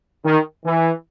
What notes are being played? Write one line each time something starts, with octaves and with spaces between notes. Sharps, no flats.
D#3
E3